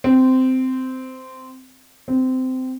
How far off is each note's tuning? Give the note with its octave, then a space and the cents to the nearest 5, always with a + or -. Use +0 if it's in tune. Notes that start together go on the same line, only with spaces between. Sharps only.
C4 -15
C4 -20